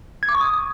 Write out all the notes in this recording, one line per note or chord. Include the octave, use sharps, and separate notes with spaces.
G#6
D6
C#6
D#6